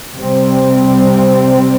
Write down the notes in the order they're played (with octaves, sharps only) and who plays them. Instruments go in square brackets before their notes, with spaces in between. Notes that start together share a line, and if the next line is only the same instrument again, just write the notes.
[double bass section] C3 G3 C4